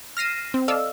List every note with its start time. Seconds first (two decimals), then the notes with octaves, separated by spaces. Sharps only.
0.17 F6 A#6 C7 D#7 E7
0.54 C4
0.68 A4 D5 D#5 F5 E6